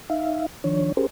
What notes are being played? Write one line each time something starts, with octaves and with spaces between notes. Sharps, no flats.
D#4 E5 F5
D#3 F3 D4 C#5
C#4 G4 G#4 A#4 C5